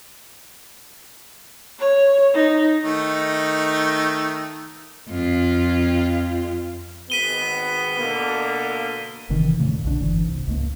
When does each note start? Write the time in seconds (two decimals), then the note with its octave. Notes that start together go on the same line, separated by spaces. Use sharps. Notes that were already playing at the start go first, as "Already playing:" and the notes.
1.79 C#5
2.34 D#4
2.84 D#3 A3 D#4
5.09 F2 F4
7.10 G#1 B3 B6 D#7 G7
7.99 B2 D3 A#3
9.29 G1 C3 D#3 E3
9.59 F2 A#2 C#3 A3
9.84 B1 D3 D#3 D4
10.00 F#1 G#2 E3
10.25 C2
10.47 C#2 G#2 A#3